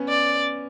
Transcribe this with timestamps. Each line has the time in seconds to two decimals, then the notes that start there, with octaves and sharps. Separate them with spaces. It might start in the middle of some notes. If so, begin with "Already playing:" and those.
Already playing: B3 C#4
0.09 D5